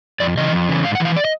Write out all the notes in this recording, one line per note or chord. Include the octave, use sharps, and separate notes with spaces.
F2 D5
C#3 E3 D#5
F2
C#3 E3
G#2 F5
F#5
E3
F5
D5
D#5